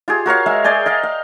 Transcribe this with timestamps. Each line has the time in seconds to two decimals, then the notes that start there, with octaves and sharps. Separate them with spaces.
0.08 F4 G4 G#4
0.26 F#4 A#4 C#5 F5
0.46 G#3 E5 F5
0.64 G#4 D5 G5 G#5
0.86 D#5 F5 G5
1.03 F5